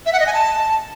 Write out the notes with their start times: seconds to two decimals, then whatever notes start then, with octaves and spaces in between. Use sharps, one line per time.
0.06 E5
0.13 F#5
0.19 D#5
0.26 G#5
0.33 A5